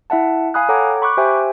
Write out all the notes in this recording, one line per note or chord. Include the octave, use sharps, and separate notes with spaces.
E4 E5 F#5 A5
F5 G#5 B5 D#6 F#6
A4 C#5 F#5 G5 A#5 D6
B5 C#6 D6 F#6
G4 C5 E5 G5 G#5